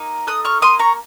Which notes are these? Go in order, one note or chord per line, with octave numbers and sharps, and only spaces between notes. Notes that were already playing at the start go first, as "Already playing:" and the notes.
Already playing: A#3 D#4
A4 D#6 F#6
C#6 F6
A#3 C6 D#6
A#5 C#6